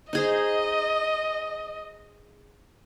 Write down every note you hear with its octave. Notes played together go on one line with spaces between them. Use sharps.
D#4 G#4 C5 D#5